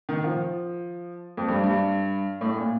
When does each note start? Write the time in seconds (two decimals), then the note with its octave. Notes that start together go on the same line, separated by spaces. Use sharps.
0.09 D#3
0.24 F3
1.37 F2
1.48 G2
1.64 G2
2.41 A2
2.57 A#2